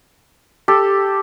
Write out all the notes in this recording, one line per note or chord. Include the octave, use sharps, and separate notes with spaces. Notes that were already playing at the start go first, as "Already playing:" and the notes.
G4 A4